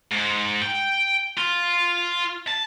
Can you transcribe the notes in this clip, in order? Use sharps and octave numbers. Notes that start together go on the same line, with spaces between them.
G#2
G5
F4
A5